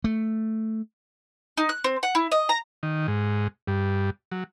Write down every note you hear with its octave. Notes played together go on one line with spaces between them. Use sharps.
A3
D#4
F#6
C4
F#5
E4
D#5
A#5
D#3
G#2
G2
F#3